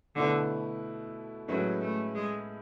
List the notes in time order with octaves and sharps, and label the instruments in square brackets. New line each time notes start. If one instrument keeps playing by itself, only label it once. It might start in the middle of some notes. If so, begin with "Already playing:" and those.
[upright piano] B2 A3 E4 B4 [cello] D3
[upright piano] A2 G#3 C#4 E4 B4 [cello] F#3
[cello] A3
G#3